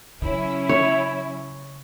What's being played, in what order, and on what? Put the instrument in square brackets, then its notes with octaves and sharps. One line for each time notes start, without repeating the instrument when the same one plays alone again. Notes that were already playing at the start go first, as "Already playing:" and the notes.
[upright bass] C#3 [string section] F#3 C#4 E4
[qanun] C#5